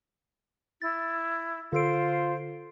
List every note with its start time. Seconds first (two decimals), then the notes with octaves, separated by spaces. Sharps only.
0.82 E4 A6
1.73 D3 F4 A4 C5 D7